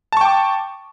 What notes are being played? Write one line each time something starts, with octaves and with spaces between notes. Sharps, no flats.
G5 A5 C#6 D6